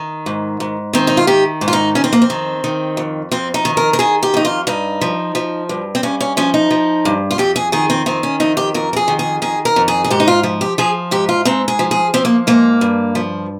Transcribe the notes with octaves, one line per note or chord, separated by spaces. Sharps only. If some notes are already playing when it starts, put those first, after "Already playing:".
Already playing: D#3
G#2
G#2
D#3 C4
D#4
F4
D#3 G4
G#2
F4
D#4
F2 C#4
C4
A#3
C4
D#3
D#3
F2
F2 C4
D#4
D#3
A#4
A#4
D#3 G#4
G4
F2 D#4
F4
G2 D#4
F3
F3
G2
C4
G2 C#4
C#4
F3 C#4
D#4
F3
G2
F4
F2 G4
G#4
D#3 G#4
C4
D#3 C4
C#4
F2 D#4
G4
F2 A#4
A#4
G#4
D#3
G#4
D#3 G#4
A#4
F2
G#4
G#4
G#2 G4
D#4
F4
F3
G4
F3 G#4
G#2 G4
F4
G#2 C4
G#4
F3
G#4
F3 C4
A#3
G#2 A#3
G2
F3